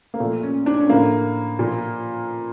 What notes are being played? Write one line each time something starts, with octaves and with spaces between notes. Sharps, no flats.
A#3
A#2 F3 A3
C#4
D4
C#4
A2 F3 A#3
A#2 F3